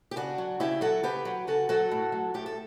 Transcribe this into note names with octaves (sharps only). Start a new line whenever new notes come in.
G4
C#3 D4 F#4
F#3
C#3 E4 G4
F#3 F#4 A4
C#3 G4 B4
F#3
C#3 F#4 A4
F#3 F#4 A4
A2
F#3
A2 G4
A4